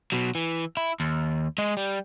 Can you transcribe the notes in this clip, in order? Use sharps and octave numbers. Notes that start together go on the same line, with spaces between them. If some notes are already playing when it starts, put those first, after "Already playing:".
B2 F#3
E3
E4
D#2
G#3 D#5
G3